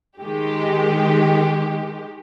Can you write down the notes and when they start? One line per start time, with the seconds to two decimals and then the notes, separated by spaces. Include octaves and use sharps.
0.21 D#3 G#3 G4